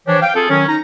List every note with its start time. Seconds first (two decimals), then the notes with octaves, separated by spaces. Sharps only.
0.07 E3 F3 D4 G4 C#5
0.22 F5 G5
0.35 C4 F4 G#4 A4
0.49 D#3 F#3 C#4
0.68 D#4 A#5